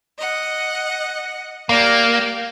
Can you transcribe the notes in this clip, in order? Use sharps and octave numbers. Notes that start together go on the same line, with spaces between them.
D#5 F#5
A#3 G4 D5